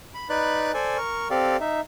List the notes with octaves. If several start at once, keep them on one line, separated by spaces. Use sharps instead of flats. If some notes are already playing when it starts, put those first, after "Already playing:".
B5
D#4 B4 D5 B5 F#6
A4 C5 D5 G#5
A#4 C#6
C4 G4 A4 D5 F5
D#4 E5